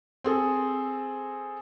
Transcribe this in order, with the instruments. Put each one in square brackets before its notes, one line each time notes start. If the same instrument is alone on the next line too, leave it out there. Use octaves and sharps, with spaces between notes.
[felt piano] C4 G#4 A4